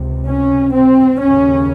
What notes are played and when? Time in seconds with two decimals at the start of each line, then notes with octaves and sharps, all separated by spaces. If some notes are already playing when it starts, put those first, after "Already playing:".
Already playing: C#2 C3
0.27 C#4
0.74 C4
1.20 D#2 C#3 C#4